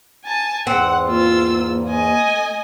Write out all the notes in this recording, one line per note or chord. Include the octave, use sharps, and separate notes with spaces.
G#5 A5
E2 G#2 C4 G#4 F#5
A#3 F4 E6
D#5 G#5
A3